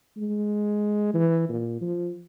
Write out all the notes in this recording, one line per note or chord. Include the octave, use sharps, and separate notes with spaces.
G#3
E3
A#2
F3